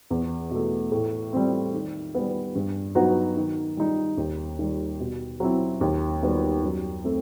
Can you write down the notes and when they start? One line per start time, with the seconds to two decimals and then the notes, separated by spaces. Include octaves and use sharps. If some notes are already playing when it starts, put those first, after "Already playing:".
0.10 E2
0.51 B2 A3
0.92 A2
1.33 G3 C4
1.74 D#3
2.15 G3 B3
2.55 G2
2.95 F#3 B3 D#4 F#4
3.37 D#3
3.77 G3 D#4
4.17 D#2
4.59 D#3 G3
5.00 B2
5.40 F#3 C4 E4
5.81 D#2
6.22 D#3 G3 B3 F#4
6.63 F#2
7.04 A3 C4